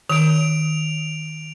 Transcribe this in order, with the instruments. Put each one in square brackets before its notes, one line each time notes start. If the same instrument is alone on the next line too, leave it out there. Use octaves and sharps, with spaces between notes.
[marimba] D#3 [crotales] D7 F7